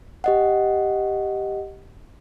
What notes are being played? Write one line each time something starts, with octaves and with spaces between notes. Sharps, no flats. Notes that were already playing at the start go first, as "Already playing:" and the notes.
G4 D#5 F#5